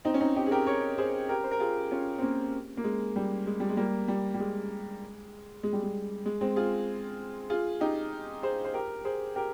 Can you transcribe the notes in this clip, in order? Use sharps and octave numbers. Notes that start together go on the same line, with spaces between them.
C4 D#4
C#4
C4 D#4
D#4 G4
G#4
G4 A#4
A#4 C#5
G#4 C5
G4 A#4
C5
A#4
F4 G#4
C#4 F4
C4
A#3 C#4
A#3
G#3
G3
G#3
G3
G#3
G3 A#3
G3
G3
G#3
G#3
G3
G#3
G#3
G#3 C4
F4 G#4
F4 G#4
D#4 G4
G#4 C5
C5
G4 A#4
G#4 C5
G4 A#4